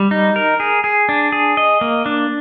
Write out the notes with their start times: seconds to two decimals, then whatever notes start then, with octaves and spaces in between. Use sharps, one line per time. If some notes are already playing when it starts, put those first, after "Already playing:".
Already playing: G3
0.11 D#4
0.36 A#4
0.60 G#4
0.84 G#4
1.09 D4
1.32 G#4
1.57 D#5
1.81 A#3
2.06 D4